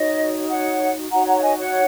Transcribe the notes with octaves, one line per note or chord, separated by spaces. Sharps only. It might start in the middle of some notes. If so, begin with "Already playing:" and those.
Already playing: D#4 F#4 C#5 D#5
C#5 F#5
D#4 F#4 C#5 F#5 A#5
F#5 A#5
F#5
D#5 G#5
C#5 F#5